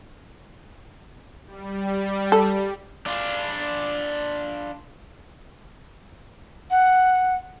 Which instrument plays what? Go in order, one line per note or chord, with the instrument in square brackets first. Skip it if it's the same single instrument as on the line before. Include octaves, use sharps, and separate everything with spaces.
[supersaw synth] G3
[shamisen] A4
[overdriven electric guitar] D4 F4
[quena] F#5